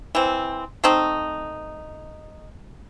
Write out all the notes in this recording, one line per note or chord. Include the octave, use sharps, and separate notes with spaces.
E3 C4
A3 C4 D#4